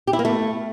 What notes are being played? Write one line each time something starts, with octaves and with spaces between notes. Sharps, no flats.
G4
E4
A#3
A3